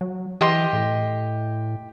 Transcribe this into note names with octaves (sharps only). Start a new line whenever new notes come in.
F#3
E3 G4 D#5 C6
A2